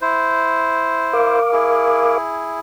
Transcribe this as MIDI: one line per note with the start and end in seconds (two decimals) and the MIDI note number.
0.01 1.39 64
0.01 1.39 72
1.13 2.18 70
1.13 2.18 77
1.13 2.18 86
1.52 2.60 64
1.52 2.60 68